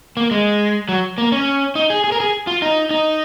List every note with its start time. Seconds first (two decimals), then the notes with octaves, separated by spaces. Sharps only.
0.17 A#3
0.31 G#3
0.89 F#3
1.18 A#3
1.32 C#4
1.75 D#4
1.90 G#4
2.04 G#4
2.12 A#4
2.20 G#4
2.47 F4
2.62 D#4
2.91 D#4